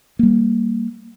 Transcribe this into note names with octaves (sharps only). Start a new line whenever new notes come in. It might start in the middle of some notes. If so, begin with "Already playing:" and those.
G3 A#3